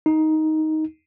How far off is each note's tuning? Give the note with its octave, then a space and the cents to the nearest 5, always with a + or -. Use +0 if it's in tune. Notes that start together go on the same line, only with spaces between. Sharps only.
D#4 +10